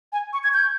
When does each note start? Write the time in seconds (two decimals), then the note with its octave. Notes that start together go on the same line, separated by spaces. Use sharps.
0.12 G#5
0.33 C#6
0.44 G#6
0.54 G6